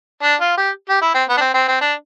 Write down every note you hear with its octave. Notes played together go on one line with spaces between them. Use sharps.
D4
F4
G4
G4
E4
C4
B3
D4
C4
C4
C4
D4